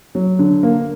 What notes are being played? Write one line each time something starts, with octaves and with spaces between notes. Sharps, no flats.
F#3
D3
A#3